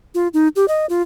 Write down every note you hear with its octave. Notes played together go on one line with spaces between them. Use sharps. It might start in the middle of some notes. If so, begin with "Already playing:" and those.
F4
D#4
G4
D#5
F4